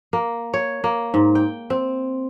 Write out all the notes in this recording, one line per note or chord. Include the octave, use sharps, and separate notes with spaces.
A#3
C#5
A#3
G#2
G5
C4